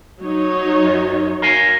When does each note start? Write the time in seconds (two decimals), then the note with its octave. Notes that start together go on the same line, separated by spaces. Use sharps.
0.21 F#3 D#4 C#5
0.84 F#2
1.42 A#4 F5 G#5